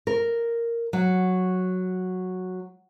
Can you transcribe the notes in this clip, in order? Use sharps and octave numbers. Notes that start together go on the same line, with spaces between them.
A#4
F#3